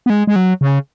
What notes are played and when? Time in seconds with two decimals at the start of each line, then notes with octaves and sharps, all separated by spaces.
0.06 B3
0.10 G#3
0.27 G#3
0.36 F#3
0.61 C#3